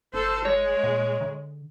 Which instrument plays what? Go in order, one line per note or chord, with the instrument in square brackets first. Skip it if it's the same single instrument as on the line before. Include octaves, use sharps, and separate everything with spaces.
[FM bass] G1 [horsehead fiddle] A4 C5
[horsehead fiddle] G#3 [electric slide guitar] C#5
[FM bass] A#2
D3